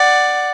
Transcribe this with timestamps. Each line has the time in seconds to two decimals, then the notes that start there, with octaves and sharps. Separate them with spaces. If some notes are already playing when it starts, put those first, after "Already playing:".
Already playing: D5 F#5